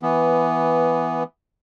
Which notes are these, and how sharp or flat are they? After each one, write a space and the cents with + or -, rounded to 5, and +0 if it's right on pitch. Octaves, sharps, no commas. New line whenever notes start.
E3 +5 B3 +0